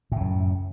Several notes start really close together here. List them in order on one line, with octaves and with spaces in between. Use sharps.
A2 C#3 F#2